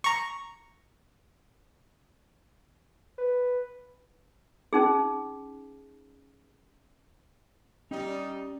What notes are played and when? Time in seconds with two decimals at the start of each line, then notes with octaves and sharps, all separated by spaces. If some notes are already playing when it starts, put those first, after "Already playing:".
0.04 A#5 C#6
3.18 B4
4.73 C#4 D#4 G#4
7.91 G3 C#4 D#4 G4 D5